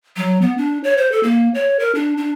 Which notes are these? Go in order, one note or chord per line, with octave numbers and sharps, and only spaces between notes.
F#3
B3
D4
C#5
C5
A4
A#3
C#5
A#4
D4
D4